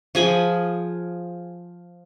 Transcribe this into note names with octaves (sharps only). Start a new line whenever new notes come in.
F3 G#4 G#5 B5